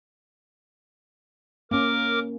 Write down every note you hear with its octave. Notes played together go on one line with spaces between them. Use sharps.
A#3 C#4 A#4 D6